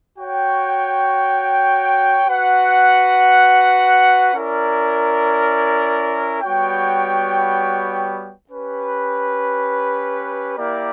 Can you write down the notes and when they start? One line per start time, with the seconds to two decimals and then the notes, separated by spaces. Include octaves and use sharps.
0.18 F#4 C#5 G5
2.26 F#4 B4 F#5
4.34 C#4 E4 A#4 D5
6.41 G3 B3 F#4 C#5 G5
8.49 C#4 G4 B4
10.57 A#3 E4 G4 A#4 D5